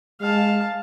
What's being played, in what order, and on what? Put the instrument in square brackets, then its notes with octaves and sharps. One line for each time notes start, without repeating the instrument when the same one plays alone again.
[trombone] G#3 [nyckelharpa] F5 A5